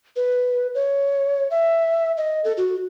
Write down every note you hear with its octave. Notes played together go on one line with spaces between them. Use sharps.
B4
C#5
E5
D#5
A4
F#4